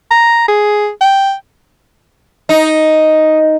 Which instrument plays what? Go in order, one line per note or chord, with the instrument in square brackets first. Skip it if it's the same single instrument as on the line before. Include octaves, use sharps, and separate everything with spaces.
[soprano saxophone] A#5
G#4
G5
[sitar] D#4